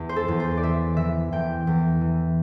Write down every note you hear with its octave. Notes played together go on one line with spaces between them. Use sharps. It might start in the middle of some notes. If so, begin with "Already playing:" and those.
Already playing: E2
C5
A4
E2
C5
D5
E3 E5
E3 E5
E2 G5
E2
E3